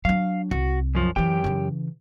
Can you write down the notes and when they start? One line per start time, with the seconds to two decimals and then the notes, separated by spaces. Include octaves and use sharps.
0.05 F#3 D4 F5
0.51 C2 F#4
0.95 F#2 F3
1.16 F#2 E3 C4 G4 G5
1.44 C#3 E3